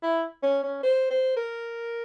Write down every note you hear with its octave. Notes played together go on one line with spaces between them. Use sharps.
E4
C#4
C#4
C5
C5
A#4